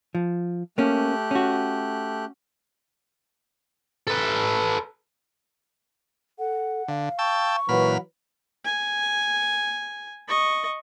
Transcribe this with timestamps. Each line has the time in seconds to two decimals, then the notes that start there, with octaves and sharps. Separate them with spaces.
0.15 F3
0.78 A3 A#3 C#4 G4 F#6
1.31 C#4 F#4
4.08 A4 B4
6.39 A4 F#5
6.88 D3 F5
7.19 G5 A5 C#6 E6
7.69 A#2 E3 F#3 B4 F#5 B5 F6
8.65 G#5
10.29 D#5 C#6